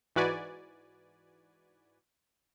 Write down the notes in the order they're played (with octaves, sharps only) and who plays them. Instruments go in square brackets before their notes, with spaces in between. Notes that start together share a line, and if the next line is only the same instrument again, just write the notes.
[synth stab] G#2 E3 F#4 B4 D5 G#5